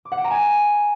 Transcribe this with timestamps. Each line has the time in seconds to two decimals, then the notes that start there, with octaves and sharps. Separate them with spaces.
0.05 D6
0.12 F#5
0.18 G5
0.24 A#5
0.31 G#5